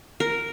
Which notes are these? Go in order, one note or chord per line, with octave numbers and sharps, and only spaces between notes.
A#4